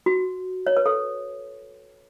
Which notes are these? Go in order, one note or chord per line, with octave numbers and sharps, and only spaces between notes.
F#4
C#5
B4
A4